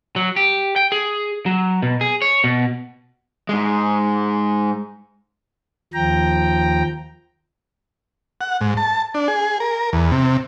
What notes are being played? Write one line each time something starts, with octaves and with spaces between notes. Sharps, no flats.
F#3
G4
G5
G#4
F#3
B2
G#4
C#5
B2
G#2 G#3
D#2 F3 G5 A#5
F#5
G#2
A5
D4
G#4
A#4
E2
C3